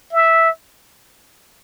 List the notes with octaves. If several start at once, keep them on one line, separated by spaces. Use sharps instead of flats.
E5